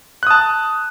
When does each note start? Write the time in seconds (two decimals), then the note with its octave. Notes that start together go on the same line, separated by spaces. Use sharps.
0.23 F#6
0.27 D#6
0.31 A5